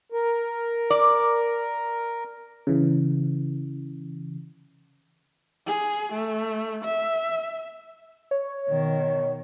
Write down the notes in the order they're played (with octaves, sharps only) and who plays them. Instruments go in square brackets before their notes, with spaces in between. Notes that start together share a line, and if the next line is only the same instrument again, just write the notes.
[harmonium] A#4
[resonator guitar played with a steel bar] D5
[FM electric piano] C#3 E3
[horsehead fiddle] G#4
A3
E5
[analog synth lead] C#5
[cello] B2 D#3